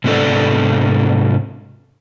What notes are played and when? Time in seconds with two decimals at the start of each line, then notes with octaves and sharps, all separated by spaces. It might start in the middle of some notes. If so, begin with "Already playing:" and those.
0.04 G#2 C3 B3 D4 A4 D5